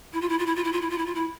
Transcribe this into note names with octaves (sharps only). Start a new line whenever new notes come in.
E4
F4
E4
F4
E4
F4
E4
F4
E4
F4
E4
F4
E4